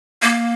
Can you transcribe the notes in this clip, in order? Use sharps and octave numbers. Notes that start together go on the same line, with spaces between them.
A#3